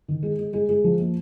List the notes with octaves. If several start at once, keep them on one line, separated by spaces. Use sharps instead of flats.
D#3
G#3
G#3
G#3
G#3
F3
A#3